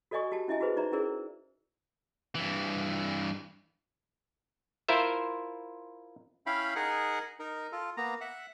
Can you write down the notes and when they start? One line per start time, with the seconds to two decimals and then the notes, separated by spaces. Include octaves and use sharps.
0.11 F#4 A4 D5 D#5 G#5 C#6
0.32 F#4 G4 A5
0.48 C#4 E4 D#5 E5 G#5
0.61 F#4 G#4 B4 C5
0.76 D#4 D5 E5 A#5
0.92 C#4 E4 G#4 A#4 C5 D5
2.35 G2 E3
4.88 E4 F4 A#4 C5 E5
6.46 C#4 E4 F5 G5 B5
6.76 D#4 G#4 A#4 F#5
7.39 D#4 A#4
7.72 F4 A4
7.97 A#3 B3 A#5
8.21 E5 F#5